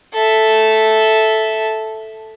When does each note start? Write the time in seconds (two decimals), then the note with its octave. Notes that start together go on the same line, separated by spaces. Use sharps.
0.14 A4 E5